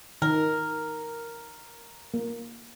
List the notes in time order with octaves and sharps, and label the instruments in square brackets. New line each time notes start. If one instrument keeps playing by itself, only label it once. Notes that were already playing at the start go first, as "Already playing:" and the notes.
[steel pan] D#3 [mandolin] A#4
[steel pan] A#3